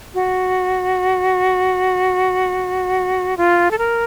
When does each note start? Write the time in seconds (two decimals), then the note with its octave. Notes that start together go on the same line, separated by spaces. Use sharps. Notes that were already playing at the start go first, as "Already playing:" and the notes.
0.14 F#4
3.37 F4
3.71 A4
3.78 A#4